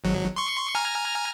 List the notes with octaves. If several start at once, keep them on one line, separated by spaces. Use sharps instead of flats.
G#1 F#3
C6 C#6
G#5 A#5 F6